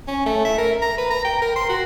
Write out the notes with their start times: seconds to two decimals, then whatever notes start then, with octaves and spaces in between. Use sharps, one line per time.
0.08 C#4
0.26 A3
0.45 E5
0.58 A#4
0.82 A#5
0.98 B4
1.11 A#5
1.25 G5
1.42 A#4
1.56 C6
1.69 F#4